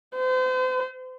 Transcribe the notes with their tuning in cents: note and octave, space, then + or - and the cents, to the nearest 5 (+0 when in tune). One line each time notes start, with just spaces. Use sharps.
C5 -40